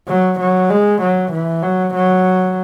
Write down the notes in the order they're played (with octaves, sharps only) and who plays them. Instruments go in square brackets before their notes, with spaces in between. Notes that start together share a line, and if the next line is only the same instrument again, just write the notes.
[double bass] F#3
F#3
G#3
F#3
E3
F#3
F#3